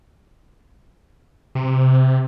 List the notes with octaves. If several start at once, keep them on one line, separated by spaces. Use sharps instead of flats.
C3